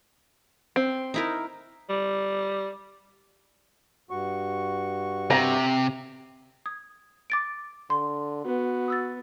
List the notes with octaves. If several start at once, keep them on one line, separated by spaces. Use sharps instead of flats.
C4
D#4 E4 A#4
G3
G2 F#4 C#6
C3 A#5
D#6 G#6
D6 A6 D7
D3 C6
B3 F#4
D#6 E6 A6